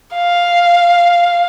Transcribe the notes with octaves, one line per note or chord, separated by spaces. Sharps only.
F5